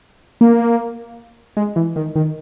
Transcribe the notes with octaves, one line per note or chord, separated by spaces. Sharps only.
A#3
G#3
E3
D#3
D#3